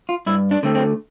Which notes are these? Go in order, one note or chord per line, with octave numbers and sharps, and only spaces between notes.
F4
G2 E4
D4
D3 A3 C4
C4